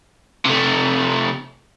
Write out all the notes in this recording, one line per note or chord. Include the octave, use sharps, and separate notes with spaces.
C3 A3